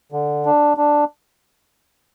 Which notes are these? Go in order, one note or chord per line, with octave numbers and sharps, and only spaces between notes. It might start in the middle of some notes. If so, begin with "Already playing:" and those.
D3
D4
D4